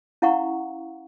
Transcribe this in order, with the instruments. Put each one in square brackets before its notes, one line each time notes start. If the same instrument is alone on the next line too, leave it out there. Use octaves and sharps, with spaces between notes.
[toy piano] C#4 E4 F5 F#5 A#5 C#6